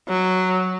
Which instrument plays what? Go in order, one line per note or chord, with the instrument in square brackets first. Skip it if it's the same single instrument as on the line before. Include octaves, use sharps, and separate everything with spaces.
[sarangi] F#3